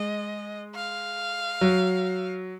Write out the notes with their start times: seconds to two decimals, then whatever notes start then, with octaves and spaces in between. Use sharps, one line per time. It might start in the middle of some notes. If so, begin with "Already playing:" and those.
Already playing: G#3 D#5
0.75 F5
1.61 F#3